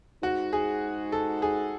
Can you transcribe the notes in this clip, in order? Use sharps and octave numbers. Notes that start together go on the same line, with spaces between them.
G#2 F#4
G#4
A4
G#4